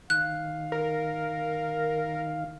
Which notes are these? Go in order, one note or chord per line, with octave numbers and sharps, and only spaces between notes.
D#3 F5 F#6
A#4